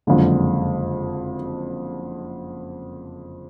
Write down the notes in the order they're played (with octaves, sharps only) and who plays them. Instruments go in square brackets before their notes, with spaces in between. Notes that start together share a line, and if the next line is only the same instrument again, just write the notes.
[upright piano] F#1 F2 D3 G#3